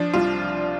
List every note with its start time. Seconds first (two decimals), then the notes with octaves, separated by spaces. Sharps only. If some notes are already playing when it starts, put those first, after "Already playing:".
Already playing: F3 D4
0.14 C2 F4